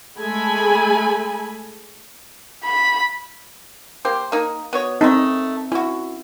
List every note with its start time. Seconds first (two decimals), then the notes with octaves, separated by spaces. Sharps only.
0.19 G#3 A3 A4 G#5 B5
2.64 B5
4.05 A#3 G4 C5
4.32 A#3 D#4
4.73 B3 F#4 C#5
5.01 A3 C4 C#4 D#4 A4
5.72 C#4 E4 F#4